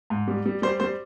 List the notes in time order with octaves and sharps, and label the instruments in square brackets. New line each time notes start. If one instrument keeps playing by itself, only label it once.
[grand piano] G#2
G3
G3
G3 C5
G3 C5